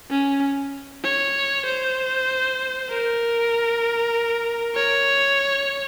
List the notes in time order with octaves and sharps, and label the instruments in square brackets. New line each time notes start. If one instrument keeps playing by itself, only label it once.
[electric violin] C#4
C#5
C5
A#4
C#5